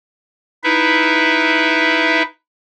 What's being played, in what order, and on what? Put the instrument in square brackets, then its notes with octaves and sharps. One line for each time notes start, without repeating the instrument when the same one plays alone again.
[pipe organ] D#4 E4 B4 E5